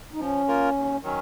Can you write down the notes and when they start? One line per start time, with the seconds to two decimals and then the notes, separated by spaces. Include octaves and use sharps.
0.13 D#4
0.19 F3 C#4
0.48 A#3 F4 A#4
0.76 D#2
1.02 D#3 F#3 C#4